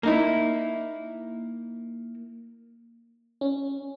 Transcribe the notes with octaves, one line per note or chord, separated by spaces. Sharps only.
A#3 D#4 E4
C#4